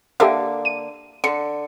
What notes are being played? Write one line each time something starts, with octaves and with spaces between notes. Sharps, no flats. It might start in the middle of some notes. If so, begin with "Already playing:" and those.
D3 A#3 G4 A4 E5
D#7
D3 C#7